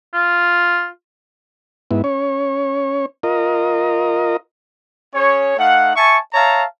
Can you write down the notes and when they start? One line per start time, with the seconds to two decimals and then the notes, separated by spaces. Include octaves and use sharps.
0.14 F4
1.91 G#2 B3 E4
2.04 C#4 C#5
3.23 F4 A#4 D#5
5.15 C#4 G#4 C#5
5.57 A3 D#4 F5 F#5
5.96 E5 G#5 A5 C#6
6.33 C#5 E5 F5 A5 A#5